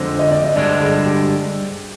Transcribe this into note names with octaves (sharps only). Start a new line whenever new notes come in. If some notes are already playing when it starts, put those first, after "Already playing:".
Already playing: F2 D3 G#3 C5
D#5
D5
D#5
G2 D3 G#3 D4 D5
G#4
G4